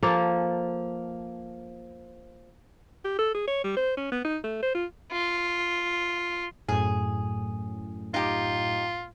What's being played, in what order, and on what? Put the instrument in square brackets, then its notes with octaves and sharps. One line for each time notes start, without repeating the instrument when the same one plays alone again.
[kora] F3 A#3 A4
[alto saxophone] G4
A4
G#4
C#5
G3
C5
C#4
B3
D#4
A3
C5
F4
[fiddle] F4
[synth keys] F#2 A2 [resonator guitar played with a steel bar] G#4
[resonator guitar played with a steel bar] D#4 G4 [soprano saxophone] F4